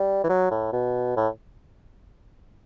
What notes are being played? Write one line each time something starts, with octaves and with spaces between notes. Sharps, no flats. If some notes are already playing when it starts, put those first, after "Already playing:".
Already playing: G3
E3
F#3
A2
B2
A2